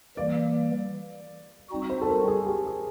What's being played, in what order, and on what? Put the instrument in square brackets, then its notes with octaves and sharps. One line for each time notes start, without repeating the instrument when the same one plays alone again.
[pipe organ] E3 G3 A#3 [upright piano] D5
[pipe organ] G3 C4 D#4 F#4
[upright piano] C5
A4
A#4
G#4
G4
G#4